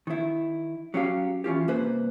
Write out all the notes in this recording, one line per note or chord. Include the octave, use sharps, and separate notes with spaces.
D#3 E4
F#3 C#4 G4 F5
E3 C#4 F4 G4
C2 A#3 B4 C5